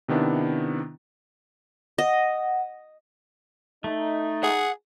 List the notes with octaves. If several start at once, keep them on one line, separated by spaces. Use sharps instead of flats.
C3 D#3 B3 D4 E4
D#5 F#5
A3 D#4
G#4 F#5